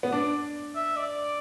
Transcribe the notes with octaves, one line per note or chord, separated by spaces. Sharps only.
B3
D4 D5
E5
D5